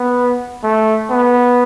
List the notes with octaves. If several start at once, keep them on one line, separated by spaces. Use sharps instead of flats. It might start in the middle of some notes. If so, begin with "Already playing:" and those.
Already playing: B3
A3
B3